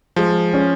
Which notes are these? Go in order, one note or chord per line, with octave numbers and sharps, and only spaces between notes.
F3 G#3
C#4